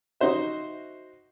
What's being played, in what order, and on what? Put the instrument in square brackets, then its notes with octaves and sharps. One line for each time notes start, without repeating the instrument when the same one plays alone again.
[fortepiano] D#4 F#4 C5 E5